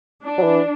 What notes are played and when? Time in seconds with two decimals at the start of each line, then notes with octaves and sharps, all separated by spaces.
0.23 D4
0.38 F#3
0.43 E3